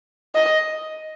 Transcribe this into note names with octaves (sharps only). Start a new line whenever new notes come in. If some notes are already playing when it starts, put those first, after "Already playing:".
D#5